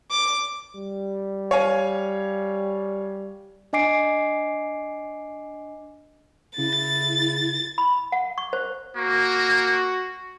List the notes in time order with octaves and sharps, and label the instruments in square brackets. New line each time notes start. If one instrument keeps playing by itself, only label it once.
[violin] D6
[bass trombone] G3
[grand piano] C#5 F5 G#5
[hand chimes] D4 D#5 G#5 D6 C7 D7
[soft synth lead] C#3 [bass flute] E4 [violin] A6
[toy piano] B5
F#5
C#6
C5
[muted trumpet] A#3 [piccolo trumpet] F#4